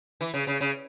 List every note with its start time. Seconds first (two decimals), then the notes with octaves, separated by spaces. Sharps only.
0.21 E3
0.34 C#3
0.47 C#3
0.61 C#3